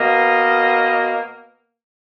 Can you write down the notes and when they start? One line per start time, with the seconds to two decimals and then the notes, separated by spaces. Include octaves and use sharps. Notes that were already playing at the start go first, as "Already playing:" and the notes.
Already playing: B2 A#3 D#5